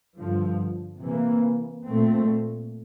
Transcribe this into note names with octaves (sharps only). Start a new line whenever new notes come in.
G2 D3 F3
C3 E3 A#3
A#2 A3 C4